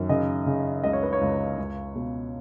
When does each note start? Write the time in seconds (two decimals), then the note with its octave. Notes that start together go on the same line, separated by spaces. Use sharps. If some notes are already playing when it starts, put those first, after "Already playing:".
Already playing: F#2 D#3
0.09 C#3 D#5
0.46 C#3
0.84 C#2 D#5
0.93 C#5
1.03 B4
1.13 C#5
1.21 C#2
1.58 C#2
1.95 B2